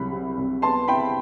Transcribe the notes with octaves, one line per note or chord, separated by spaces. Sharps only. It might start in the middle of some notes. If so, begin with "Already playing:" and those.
Already playing: C2 F#3 B5
C3
C2
B3 A5 C6
E4 G5 B5